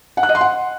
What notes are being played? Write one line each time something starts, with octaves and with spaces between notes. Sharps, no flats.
F#5
F#6
D#5
C6
F#5